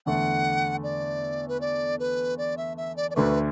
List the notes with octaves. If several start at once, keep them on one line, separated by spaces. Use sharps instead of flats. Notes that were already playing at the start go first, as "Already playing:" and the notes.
E2 D3 A3 F#5
D5
B4
D5
B4
D5
E5
E5
D5
D5
D2 D3 A3 B4